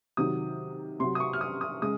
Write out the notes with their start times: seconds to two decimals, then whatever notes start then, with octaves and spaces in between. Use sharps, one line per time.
0.17 C3 D#3 F#3 D#6
0.99 C3 F#3 C6
1.15 D#6
1.20 C#6
1.33 F6
1.41 D#6
1.61 D#6
1.82 C#3 G#3 D#6